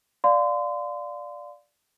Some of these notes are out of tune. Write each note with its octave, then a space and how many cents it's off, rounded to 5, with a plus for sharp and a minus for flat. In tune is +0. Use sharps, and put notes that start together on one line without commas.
D5 +0 F5 +10 C6 -30